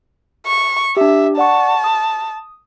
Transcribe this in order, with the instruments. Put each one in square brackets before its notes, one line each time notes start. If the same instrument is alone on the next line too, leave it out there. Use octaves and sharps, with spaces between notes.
[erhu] C#6
[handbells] D4 G4 [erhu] E5
[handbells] D5 F#5 C#6 [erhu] A5
[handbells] D#6